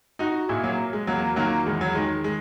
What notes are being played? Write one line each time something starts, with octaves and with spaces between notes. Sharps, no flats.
D#4 F#4
A#2 E4 G#4
F#3 A#3
G#3
E2 F#3 A#3
D#3 F#3 A#3
E2 G#3
F#3
D#3 G#3
G#3